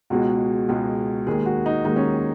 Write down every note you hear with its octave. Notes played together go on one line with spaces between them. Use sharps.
C#2 B2 G#3 F#4
C#2 B2 G#3
D#2 D#3 G#3 G#4
F#4
D#4
D#2 D#3 G#3 D#4
C#4